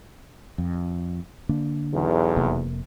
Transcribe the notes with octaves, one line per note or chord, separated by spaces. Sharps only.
F2
D3 A#3 D4
B1 E2
F1 C3 A#3